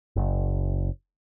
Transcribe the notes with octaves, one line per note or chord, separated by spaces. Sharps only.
F#1